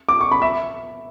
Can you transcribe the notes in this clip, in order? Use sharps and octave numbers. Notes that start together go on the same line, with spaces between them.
D6
C#6
B5
E5